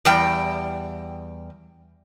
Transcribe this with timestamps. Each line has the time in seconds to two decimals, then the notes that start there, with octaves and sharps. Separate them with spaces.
0.05 E2 G3 G5